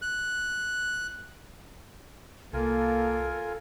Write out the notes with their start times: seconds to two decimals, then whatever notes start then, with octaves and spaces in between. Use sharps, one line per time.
0.02 F#6
2.53 C2 A#3 F4 A4 A#4 G#5